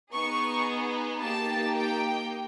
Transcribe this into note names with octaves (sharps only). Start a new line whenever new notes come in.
B3 D#4 G#4 C#6
A#3 D#4 G4 A5
G5